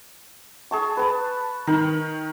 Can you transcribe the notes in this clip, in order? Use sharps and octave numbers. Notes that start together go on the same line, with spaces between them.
G#4 A5 C#6
B4 A5
D#3 A#4